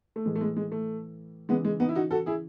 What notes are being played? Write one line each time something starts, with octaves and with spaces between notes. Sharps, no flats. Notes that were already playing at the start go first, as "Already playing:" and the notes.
A3
A2 E3 G#3
A3
G#3
G#3
A3
C#3 E3 G#3 B3
G#3
B3 D#4
E4
D#4 F#4
F#4 A4
E4 G#4